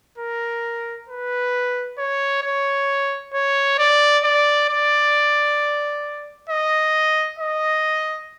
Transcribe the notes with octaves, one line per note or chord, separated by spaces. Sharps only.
A#4
B4
C#5
C#5
C#5
D5
D5
D5
D#5
D#5